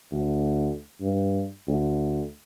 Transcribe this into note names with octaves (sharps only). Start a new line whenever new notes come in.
D2
G2
D2